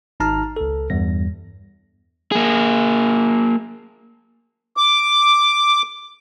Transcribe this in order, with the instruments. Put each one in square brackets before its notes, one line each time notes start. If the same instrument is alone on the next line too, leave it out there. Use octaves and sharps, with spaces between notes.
[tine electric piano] G#1 D#4 A5 A#5 F6
C#2 A4
E2 G2 G3 A#6
[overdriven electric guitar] A#3 G#4
[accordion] D6